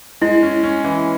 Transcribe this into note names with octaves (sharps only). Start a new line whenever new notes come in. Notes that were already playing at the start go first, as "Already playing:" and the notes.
G#3 E4
C#4
C#4
E3